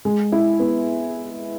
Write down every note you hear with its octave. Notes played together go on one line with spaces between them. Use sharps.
G#3
E4
B3